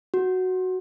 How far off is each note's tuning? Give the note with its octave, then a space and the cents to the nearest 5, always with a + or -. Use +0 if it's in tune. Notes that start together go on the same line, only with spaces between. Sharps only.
F#4 +0